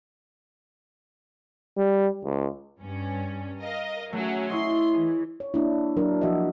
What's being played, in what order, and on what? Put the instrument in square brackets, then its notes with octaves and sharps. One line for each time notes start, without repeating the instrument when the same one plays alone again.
[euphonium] G3
C#2
[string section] G2 C#4
A#4 D#5 F5
[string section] F#3 C#4 [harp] A3 G#4
[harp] E4 C#5 D#5 [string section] C6
[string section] E3 [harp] G#4
[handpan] C#5
A#3 D4 E4
F#3 D4 A#4
F3 F#4 A#4 D#5 E5